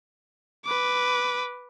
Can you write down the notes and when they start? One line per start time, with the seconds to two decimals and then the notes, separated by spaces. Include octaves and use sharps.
0.65 B4 D6